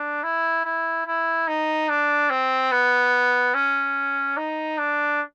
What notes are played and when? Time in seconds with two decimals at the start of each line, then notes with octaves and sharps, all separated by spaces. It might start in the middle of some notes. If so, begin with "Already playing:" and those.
Already playing: D4
0.23 E4
0.65 E4
1.07 E4
1.48 D#4
1.89 D4
2.30 C4
2.72 B3
3.54 C#4
4.37 D#4
4.78 D4